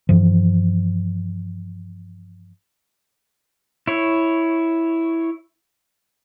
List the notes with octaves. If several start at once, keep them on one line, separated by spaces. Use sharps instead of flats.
G2 E3 F3
E4 C#5